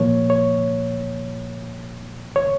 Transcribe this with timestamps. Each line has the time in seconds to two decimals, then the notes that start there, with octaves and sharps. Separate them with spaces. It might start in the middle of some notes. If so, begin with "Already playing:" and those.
Already playing: A#2 F3 A#3 C#5
0.30 C#5
2.36 C#5